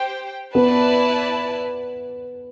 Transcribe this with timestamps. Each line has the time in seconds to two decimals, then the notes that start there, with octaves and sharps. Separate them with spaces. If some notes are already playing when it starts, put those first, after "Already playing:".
Already playing: G4 C5 G5
0.55 B3 E4 B4 D5 A5